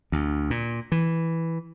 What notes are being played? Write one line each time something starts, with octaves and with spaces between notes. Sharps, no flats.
D2
A#2
E3